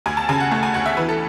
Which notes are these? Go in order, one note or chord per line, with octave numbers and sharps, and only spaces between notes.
D2 G#5
A5
C#3 G#5
F#5
A3 A5
G#5
D2 F#5
E5
E3 B4
A4